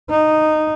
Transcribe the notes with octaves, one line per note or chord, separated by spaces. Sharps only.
D#4